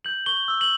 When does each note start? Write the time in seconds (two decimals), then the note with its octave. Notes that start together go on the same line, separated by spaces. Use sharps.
0.05 G6 F#7
0.26 C#6 G7
0.48 E6
0.61 F#7